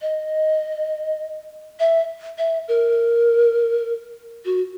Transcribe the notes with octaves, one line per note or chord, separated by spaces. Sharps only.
D#5
E5
E5
A#4
F#4